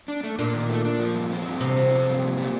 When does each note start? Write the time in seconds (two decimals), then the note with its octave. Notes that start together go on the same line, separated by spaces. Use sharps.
0.08 D4
0.23 A3
0.39 A#2 D4
0.54 D#3
0.70 A3
0.85 D4
1.00 F3
1.15 G2
1.31 C4
1.45 G2
1.61 G2 C3
1.76 C4
1.91 F3
2.07 G2
2.22 A#2
2.38 G3